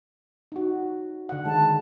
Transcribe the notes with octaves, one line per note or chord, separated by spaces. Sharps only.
D#4 F#4
D3 F#5
D#3 G#3 A5